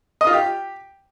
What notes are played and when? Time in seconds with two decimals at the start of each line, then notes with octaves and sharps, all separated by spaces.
0.21 D#5
0.27 F4
0.33 G4